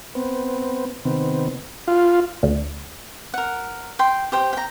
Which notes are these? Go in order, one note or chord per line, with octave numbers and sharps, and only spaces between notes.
B3 C4
C3 D#3 B3 C4
F4
D2
A#4 F#5
G5 C6
G4 C5 G5
G5 A#5